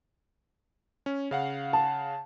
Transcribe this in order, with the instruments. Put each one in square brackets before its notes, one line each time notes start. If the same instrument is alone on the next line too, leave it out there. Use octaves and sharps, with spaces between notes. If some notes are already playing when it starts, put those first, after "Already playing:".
[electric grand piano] C#4
C#3 F5 F#5
[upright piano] A5